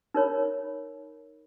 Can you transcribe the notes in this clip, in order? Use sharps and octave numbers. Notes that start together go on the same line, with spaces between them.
D#4 A#4 C#5 B5